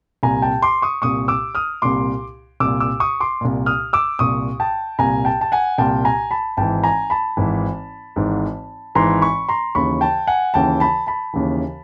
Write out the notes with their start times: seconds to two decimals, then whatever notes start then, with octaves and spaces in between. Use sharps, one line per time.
0.23 C2 A#2 G#5 A#5
0.42 G5 A5
0.62 C6 D6
0.82 C#6 D#6
1.02 C2 A#2 C#6 D#6
1.28 D6 E6
1.55 D#6 F6
1.82 C2 A#2 C6 D6
2.60 C2 A#2 D6 E6
2.80 D6 E6
3.00 C#6 D#6
3.20 C6 D6
3.41 C2 A#2
3.66 D#6 F6
3.93 D6 E6
4.19 C2 A#2 C#6 D#6
4.60 G5 A5
4.99 C2 A#2 G#5 A#5
5.25 G5 A5
5.41 A5
5.52 F#5 G#5
5.78 C2 A#2 G5 A5
6.05 G#5 A#5
6.31 A5 B5
6.57 G#1 G#2 E3 G5 A5
6.84 G#5 A#5
7.10 A5 B5
7.37 G#1 G#2 E3
8.16 G#1 G#2 E3
8.95 G#1 G#2 E3 A#5 C6
9.22 B5 C#6
9.49 A#5 C6
9.75 D#2 C#3 E3 B5 C#6
10.01 G5 A5
10.27 F#5 G#5
10.54 D#2 C#3 E3 G5 A5
10.80 A5 B5
11.07 A5 B5
11.34 D#2 C#3 E3